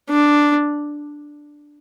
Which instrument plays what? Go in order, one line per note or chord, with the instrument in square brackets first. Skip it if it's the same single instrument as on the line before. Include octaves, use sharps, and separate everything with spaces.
[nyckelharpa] D4